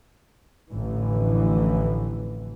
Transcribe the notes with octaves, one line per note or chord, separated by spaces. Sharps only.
A1 F2 D3 E3